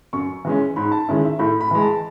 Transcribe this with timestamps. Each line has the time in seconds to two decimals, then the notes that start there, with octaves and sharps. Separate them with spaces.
0.13 F#2 C#6
0.45 E3 G#3 C#4
0.76 G#2 B5
0.92 A5
1.09 D#3 G#3 C#4 E4
1.24 E5
1.39 A2 B5
1.61 B5
1.71 E3 G#3
1.82 A5